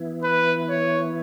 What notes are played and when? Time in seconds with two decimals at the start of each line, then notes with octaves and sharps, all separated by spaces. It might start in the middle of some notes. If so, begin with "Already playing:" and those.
Already playing: E3 B3 E4
0.22 B4
0.69 C#5